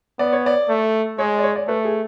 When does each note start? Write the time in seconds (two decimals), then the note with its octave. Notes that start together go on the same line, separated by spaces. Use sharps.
0.19 B3 D5
0.33 C#5
0.46 D5
0.69 A3
1.18 G#3 C#5
1.38 D5
1.43 C#5
1.56 D5
1.68 A3 B4
1.85 G#4